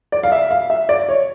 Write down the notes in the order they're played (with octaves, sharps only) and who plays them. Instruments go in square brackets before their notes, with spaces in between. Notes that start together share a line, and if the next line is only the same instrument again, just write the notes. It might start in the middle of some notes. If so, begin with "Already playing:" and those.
[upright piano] D5
F5
E5
F5
E5
D5
C#5